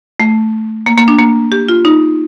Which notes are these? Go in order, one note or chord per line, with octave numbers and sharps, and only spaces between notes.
A3
A#3
A#3
D4
A#3
G4
F4
D#4